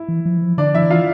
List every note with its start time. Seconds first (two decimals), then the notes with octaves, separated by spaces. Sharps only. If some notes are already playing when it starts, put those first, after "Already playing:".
Already playing: E4
0.08 E3
0.26 F3
0.38 E3
0.42 F3
0.58 D3 D4 D5
0.75 F3 E4 E5
0.83 E3
0.90 F4 F5